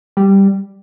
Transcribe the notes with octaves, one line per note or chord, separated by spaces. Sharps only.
G3